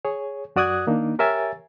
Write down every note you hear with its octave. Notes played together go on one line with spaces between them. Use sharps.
G#4 C#5
F#2 F#4 D5 D#6 F#6 G#6
D#3 A#3 D4 D#4
G4 A#4 C#5 E5 G#5 A6